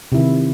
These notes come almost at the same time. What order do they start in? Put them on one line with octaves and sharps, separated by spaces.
C3 E4 D#3